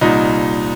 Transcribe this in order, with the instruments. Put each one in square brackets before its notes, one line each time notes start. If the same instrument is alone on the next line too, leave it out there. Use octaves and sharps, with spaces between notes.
[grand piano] C2 A#2 D#4